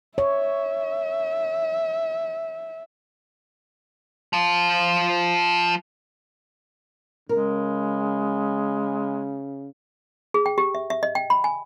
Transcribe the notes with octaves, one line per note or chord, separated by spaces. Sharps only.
C#5 E5
F3 F4
C#3 G#3 A#4
G#4
G5
G4
E5
E5
D#5
G5
B5
G#5